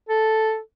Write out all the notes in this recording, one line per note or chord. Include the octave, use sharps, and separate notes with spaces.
A4